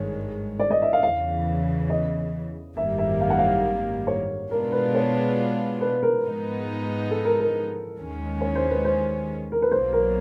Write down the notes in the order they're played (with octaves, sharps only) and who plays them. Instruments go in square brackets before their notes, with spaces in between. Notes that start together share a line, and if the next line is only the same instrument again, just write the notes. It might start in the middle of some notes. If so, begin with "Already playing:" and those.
Already playing: [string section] G#1 G2 D#3 G#3 [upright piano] C#5
[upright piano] D5
D#5
E5
F5
[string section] E2 C#3 E3 [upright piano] F5
[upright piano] D#5
[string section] G#1 F#2 D#3 G3 A#3 [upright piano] E5
[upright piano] E5
F5
F#5
F5
C#5
[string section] B2 G#3 B3 D4 F4 [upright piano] A#4
[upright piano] B4
C#5
B4
A#4
[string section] G#2 F3 G#3 B3 D#4
[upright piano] A4
A#4
A#4
[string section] D#2 D#3 G#3 C#4
[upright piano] C#5
C5
B4
C5
A#4
B4
[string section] B1 B2 F#3 A#3 [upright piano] C5
[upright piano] A#4